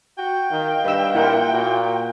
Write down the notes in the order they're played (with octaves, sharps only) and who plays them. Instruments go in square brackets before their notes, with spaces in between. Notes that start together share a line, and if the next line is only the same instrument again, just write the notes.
[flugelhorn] F#4 [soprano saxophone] G5
[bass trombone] D#3 [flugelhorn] F5
[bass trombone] G2 [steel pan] B4 D#5 E6
[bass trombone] A#2 [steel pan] E4 F4 A#4 [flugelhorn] F#5
[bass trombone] A#2 [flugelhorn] F#4